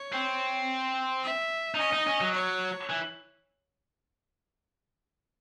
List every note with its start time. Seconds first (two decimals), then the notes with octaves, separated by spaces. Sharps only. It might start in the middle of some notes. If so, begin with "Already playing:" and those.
Already playing: C#5
0.13 C4
1.24 E5
1.75 D#4
1.79 C#4 D#5
1.93 D#4
2.07 C#4
2.21 F#3
2.34 C#5
2.90 E3